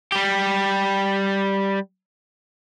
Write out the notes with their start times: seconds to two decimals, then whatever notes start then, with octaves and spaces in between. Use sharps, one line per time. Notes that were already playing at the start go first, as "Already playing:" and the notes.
0.12 G3 G4